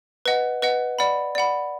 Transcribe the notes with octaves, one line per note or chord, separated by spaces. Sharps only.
B4 D#5 F#5
B4 D#5 F#5
D5 F#5 B5
D5 F#5 B5